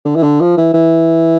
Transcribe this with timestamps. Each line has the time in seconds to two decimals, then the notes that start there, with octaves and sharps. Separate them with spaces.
0.05 D3
0.15 E3
0.23 D3
0.40 F3
0.57 E3
0.74 E3